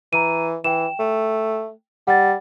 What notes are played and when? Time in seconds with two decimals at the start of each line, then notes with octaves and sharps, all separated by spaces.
0.13 E3 A#5 D#7
0.64 E3 G5 E7
0.99 A3
2.07 G3 F#5 A6